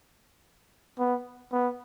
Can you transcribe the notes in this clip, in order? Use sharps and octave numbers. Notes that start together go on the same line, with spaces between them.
B3
B3